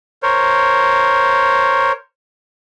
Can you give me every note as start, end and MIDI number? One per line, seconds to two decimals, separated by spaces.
0.23 1.92 70
0.23 1.92 72
0.23 1.92 73